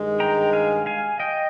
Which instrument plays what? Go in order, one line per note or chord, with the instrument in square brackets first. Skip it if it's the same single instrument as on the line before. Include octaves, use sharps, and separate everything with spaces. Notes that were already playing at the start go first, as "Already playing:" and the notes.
Already playing: [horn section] G2 D#3 G#3
[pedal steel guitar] G5 A#5
F5 G#5
F5 G#5
D#5 G5